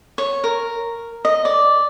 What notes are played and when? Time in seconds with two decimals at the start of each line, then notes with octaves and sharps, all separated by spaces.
0.18 C#5
0.44 A#4
1.25 D#5
1.45 D5